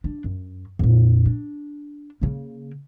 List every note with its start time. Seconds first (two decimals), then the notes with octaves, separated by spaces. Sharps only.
0.04 D4
0.24 F#2
0.79 F2 A#2
1.26 D4
2.21 C#3 A#3